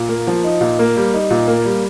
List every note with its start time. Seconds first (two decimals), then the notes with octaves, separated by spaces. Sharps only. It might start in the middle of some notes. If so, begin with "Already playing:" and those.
Already playing: A#2
0.09 A#3
0.27 F3
0.44 D#4
0.61 A#2
0.79 A#3
0.96 G3
1.14 D#4
1.30 A#2
1.48 A#3
1.65 G3